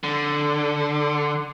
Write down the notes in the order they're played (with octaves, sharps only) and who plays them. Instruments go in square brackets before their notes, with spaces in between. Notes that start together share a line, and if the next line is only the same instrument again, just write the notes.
[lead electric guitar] D3